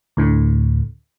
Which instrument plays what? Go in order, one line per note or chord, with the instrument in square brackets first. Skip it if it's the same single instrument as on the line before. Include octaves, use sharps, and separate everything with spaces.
[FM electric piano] D2 A2 D3